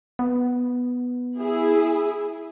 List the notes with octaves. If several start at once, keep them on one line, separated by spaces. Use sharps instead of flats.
B3
E4 G#4